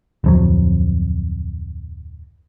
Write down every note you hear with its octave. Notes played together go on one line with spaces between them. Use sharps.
D1 F2 F#3